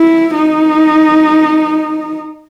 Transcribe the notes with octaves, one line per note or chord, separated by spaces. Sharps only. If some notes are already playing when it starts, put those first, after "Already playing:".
Already playing: E4
D#4